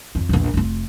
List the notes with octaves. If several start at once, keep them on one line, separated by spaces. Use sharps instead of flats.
F2 F4
A#1 E2
F1 F4